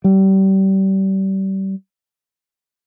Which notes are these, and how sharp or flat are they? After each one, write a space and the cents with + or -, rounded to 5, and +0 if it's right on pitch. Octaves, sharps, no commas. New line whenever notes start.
G3 -30